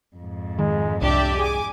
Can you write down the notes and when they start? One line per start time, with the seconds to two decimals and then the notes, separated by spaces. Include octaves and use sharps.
0.16 F2 G#2
0.59 D#3 G#3
1.02 C2 D4 G4 D5 E5
1.38 G#4 G#5 D6